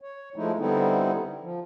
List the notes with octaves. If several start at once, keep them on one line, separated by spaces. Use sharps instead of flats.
C#5
F3 G#3 A3 D#4 E4
D3 G3 B3 C4 D#4 E4
F3